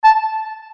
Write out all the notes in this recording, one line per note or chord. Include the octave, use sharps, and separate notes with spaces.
A5